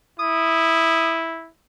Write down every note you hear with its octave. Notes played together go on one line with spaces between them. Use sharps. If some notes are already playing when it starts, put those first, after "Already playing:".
E4 D#6